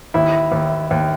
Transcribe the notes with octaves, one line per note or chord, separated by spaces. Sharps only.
D#2 E4
D#2
D#2